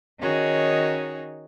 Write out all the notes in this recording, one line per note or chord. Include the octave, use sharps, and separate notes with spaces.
D#3 C#4 D#4 F#4 G#4 C#5